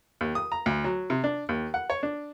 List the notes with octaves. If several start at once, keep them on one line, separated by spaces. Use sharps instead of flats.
D#2
D#6
A#5
D2
F#3
C3
D4
D#2
F#5
C#5
D4